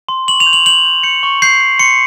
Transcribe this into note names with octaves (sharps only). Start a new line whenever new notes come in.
C6
C#6 F#7
F7
G6
F#7
G6 F#7
G6
G6 C#7
C#6
G6 C7
G6
C6 C#7